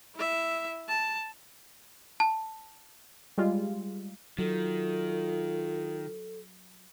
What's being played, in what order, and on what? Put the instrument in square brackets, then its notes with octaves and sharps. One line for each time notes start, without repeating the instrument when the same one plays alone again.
[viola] E4 E5
A5
[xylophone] A5
[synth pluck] G3 G#3 F4
[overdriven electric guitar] D#3 [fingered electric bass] F#3 [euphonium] F4 [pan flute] A4